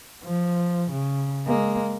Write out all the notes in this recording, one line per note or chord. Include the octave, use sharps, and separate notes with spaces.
F3
C#3
G#3 A#3